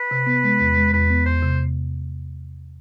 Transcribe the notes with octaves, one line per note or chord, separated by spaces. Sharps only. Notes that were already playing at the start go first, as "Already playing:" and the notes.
Already playing: B4
C3
B3
G#3
E2
G#3
E2 B4
B3
E2 C5
C3